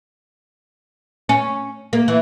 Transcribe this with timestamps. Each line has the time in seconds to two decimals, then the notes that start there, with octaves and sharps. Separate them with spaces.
1.29 C#4
1.93 A#3
2.08 E3